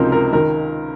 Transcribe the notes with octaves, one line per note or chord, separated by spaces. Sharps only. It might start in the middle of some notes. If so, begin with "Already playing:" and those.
Already playing: C#2 C3 F3 C4 D#4 A#4
A#4
D#3 A#4